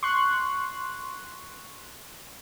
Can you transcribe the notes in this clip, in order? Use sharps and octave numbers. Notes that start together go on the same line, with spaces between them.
C6 C#6 F#6